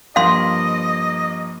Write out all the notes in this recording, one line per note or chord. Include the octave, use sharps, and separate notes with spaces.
G2 F3 A#3 D#5 F5 C6